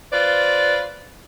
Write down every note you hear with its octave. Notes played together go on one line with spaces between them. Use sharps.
F4 B4 C5 D5